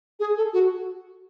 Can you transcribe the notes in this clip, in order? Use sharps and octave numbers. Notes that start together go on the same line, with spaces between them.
G#4
A4
F#4